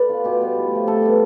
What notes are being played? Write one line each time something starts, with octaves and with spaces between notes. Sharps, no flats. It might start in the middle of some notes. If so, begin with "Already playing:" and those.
Already playing: A4 B4 D5
B3 F4
B2 G4
G3 B3
A2
F3 A3
C3 A4
G3 B3